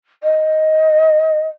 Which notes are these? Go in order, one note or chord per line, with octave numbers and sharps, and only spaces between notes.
D#5